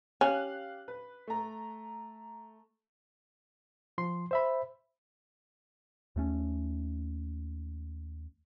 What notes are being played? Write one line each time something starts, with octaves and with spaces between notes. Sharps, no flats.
C#4 G4 F5 F#6
B4
A3 A#5
F3 C6
C5 E5 B5
D#2 A3 C#4